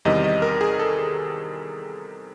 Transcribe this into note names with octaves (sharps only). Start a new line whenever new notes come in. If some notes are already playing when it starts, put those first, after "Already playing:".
E2 C3 D#3 G3 D#5
D#5
A#4
G#4
A4